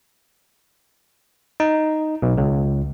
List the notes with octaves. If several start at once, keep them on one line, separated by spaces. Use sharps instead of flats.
D#4
B1
C#2